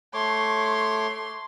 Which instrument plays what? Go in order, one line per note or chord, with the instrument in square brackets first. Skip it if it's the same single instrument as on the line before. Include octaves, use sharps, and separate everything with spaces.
[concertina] A3 C#5 D6 [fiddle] C6